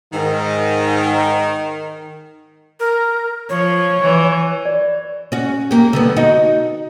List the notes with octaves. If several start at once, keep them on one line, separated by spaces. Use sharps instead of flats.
G#2 D#3
A#4
F3 C#5
E3
D5
C#4 F#4
A#3 G4
D3 G3 B3
D#4 F#4